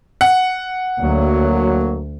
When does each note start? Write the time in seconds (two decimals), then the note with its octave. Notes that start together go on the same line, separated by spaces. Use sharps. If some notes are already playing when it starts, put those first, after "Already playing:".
0.21 F#5
0.99 D2 F#3 A#3